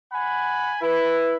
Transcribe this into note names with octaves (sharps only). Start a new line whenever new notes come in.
F#5 G#5 B5
E4 B4